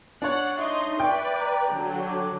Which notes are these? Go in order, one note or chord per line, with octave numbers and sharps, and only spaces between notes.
D4 C#5 F#5
D#4 D#5 E5 C6
B4 D5 G5 C#6
A#5
D3 F#3
D6